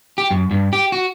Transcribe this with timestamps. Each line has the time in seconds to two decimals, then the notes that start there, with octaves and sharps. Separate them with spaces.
0.18 G4
0.31 F#2
0.51 G2
0.73 G4
0.92 F#4